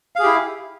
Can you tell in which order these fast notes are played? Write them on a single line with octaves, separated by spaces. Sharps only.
F5 G#4 G4 E4